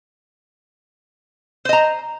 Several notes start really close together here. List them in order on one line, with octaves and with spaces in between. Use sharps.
C5 D#5 A#5